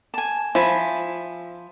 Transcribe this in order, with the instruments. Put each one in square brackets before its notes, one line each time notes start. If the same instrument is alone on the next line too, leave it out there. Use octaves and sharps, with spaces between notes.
[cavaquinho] G#5 A5
[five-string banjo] F3 [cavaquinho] E5 G#5 B5